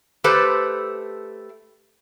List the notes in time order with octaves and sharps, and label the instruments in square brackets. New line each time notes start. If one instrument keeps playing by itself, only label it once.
[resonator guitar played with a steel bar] A3 G4 A4 B4 C5